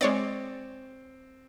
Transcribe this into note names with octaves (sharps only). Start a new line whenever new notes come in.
G#3 C4 C#5 D5